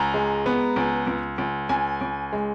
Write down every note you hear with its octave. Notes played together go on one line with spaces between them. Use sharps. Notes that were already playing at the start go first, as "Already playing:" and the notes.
Already playing: C#2 A#5
G#3
B3
C#2
C#2
C#2
C#2 G#5
C#2
G#3